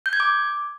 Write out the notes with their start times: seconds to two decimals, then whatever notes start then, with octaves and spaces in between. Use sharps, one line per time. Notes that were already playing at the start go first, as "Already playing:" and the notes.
0.06 G6
0.13 G#6
0.20 D6